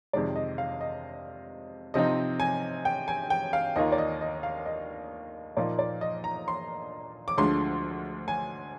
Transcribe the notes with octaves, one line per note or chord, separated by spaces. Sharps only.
F2 C3 D#3 G#3 D5
D#5
F5
D#5
C3 F3 C4 D#4 D#5
G#5
G5
G#5
G5
F5
D#2 D#3 A#3 F4 D#5
D5
D#5
D#5
F5
D#5
A#2 F3 A#3 D#4 D5
D5
D#5
A#5
C6
D6
D2 D3 F3 G#3 C6
G#5